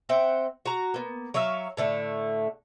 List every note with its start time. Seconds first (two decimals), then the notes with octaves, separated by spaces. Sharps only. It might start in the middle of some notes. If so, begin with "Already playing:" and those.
0.09 C4 E5 F#5 G5
0.66 F#4 A#5
0.94 A#3 B3
1.34 F#3 C#5 E5 F5
1.77 A2 D3 A3